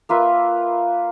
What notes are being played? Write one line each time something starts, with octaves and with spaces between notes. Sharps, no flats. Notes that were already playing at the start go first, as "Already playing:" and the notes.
A#3 F4 B4 E5